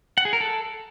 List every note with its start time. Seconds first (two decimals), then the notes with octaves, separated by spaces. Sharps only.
0.18 F#5
0.25 G#4
0.33 A#4
0.40 A4